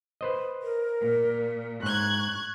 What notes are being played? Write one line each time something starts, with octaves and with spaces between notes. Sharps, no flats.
B4 C5 D#5
A#4
A#2
G#2 C#6 F#6 G#6